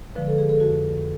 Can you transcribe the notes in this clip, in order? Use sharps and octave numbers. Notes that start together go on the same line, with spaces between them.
D3 F3 G#3 B4
A4
G#4
A4
F2 F#4